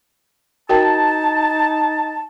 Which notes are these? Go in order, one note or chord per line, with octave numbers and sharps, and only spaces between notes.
D#4 F#4 A#4 G5 A5